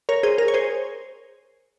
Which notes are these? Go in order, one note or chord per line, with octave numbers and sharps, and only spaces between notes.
A#4 C#5
G#4 C5
A#4
C#5
G#4 C5